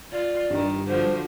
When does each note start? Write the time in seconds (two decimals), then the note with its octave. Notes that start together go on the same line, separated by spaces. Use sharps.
0.12 F4 D5
0.50 G2 D#3
0.88 D3 F3 F#4 C5